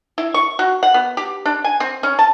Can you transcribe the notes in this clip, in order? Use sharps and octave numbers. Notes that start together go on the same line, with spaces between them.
E4
C#6
F#4
F#5
B3
G4
D4
G#5
C4
C#4
A5